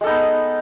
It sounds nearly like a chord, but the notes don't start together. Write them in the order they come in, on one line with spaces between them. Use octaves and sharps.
G#3 A4 D#4 B3